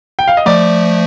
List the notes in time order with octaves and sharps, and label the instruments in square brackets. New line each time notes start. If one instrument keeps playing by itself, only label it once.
[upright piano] G5
F5
D#5
[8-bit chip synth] F3 A3 [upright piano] D5